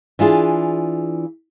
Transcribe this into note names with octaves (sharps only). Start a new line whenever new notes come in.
E3 D4 F4 G#4